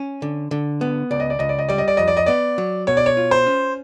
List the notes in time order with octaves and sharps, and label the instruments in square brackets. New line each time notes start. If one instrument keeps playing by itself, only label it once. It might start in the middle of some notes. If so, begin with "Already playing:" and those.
Already playing: [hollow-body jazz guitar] C#4
D3
D3
B3
[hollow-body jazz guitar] C#2 [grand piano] D5
[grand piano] D#5
D5
[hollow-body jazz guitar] C#2 [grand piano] D#5
[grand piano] D5
D#5
[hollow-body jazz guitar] G3 [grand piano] D5
[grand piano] D#5
D5
[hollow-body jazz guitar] F2 [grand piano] D#5
[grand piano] D5
D#5
[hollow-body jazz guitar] B3 [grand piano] D5
[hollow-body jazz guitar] F#3
[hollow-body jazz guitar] B2 [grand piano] C#5
[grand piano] D5
C#5
[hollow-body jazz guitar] F4
[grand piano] C5
[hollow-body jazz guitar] C#4